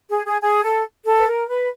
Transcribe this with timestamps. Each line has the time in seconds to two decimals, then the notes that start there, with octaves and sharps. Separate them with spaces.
0.10 G#4
0.26 G#4
0.42 G#4
0.63 A4
1.06 A4
1.19 B4
1.27 A#4
1.49 B4